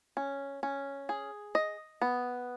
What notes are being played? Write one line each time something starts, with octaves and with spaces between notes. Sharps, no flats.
C#4
C#4
G#4
D#5
B3